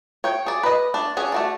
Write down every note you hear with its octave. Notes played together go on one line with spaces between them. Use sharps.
C#5 G5
G#4 D5
B4 D#5
A3 D4
C#4 D4 G#4 F#5
A3 F#4 D5